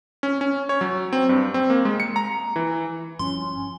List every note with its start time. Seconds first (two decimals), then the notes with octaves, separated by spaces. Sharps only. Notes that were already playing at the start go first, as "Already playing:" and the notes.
0.23 C#4
0.41 C#4
0.69 C#5
0.81 F#3
1.13 C4
1.29 G2
1.54 C4
1.70 A#3
1.85 G#3
2.00 C#7
2.16 A#5
2.56 E3
3.19 G1 G2 F3 C#4 C6